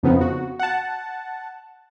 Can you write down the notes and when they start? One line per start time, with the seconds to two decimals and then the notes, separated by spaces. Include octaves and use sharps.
0.03 F2 C#3 F3 B3 C4 D#4
0.21 F#4
0.59 F#5 A5